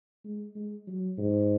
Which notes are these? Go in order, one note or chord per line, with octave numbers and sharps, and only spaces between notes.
G#3
G#3
F#3
G#2